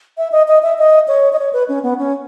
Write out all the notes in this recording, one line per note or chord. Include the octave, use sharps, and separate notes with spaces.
E5
D#5
D#5
E5
D#5
C#5
D#5
C#5
B4
C#4
B3
C#4